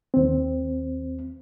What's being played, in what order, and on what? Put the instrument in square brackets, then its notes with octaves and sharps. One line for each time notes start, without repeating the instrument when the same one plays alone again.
[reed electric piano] D#2 C4